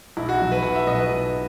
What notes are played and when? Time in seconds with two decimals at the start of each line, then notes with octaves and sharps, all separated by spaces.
0.17 B1 E4
0.29 F#4
0.40 B2 F#3
0.52 B4
0.63 B1 F#5
0.75 E5
0.87 B2 F#3 D#5
0.99 B4
1.10 B1